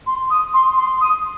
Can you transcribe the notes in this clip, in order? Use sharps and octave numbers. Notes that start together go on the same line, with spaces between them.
C6
D#6
C6
C6
D#6